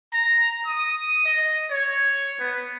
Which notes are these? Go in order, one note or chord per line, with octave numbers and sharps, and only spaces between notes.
A#5
D#6
D#5
C#5
B3